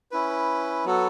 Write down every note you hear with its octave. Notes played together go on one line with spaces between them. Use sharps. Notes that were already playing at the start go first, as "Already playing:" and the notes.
C#4 E4 B4
F#3 B3 F#4 A4